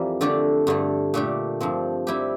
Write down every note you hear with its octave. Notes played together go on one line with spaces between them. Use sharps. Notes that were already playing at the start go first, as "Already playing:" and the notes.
Already playing: F2 E3 G3 A#3
D3 A3 D4 G4 D5
G2 D3 A3
A#2 A3 D4 G4
G2 F3 C4
G3 C4 E4 G4